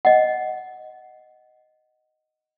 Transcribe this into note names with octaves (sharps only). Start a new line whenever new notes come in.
D#5 F#5